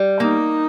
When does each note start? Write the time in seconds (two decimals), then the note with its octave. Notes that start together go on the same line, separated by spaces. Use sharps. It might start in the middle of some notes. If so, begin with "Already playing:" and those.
Already playing: G3
0.20 A#3 D#4